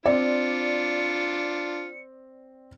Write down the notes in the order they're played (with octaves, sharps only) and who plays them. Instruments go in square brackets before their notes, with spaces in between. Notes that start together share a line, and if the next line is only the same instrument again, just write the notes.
[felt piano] C4 [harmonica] D4 F4 [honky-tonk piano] D5 [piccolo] C#7